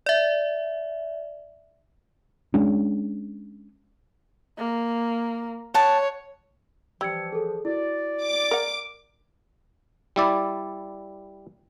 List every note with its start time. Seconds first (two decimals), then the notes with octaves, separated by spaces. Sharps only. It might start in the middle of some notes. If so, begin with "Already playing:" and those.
0.06 D5 E5
2.54 G#3 C#4 D4
4.58 A#3
5.74 C#5 F#5 A5
7.01 E3 F3 G3 E6 G#6 C#7
7.33 G#4 A4
7.65 E4 F#4 D5
8.22 D6
8.51 A#4 F#5
10.16 G3 E4 D5